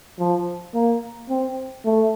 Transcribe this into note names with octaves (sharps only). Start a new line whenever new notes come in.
F3
A#3
C4
A3